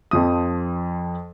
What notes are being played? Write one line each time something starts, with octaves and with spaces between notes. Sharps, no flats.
F2 F3 D#6